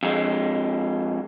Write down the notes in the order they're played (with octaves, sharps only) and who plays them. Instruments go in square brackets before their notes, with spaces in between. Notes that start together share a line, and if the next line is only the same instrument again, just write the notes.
[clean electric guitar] F2 G#3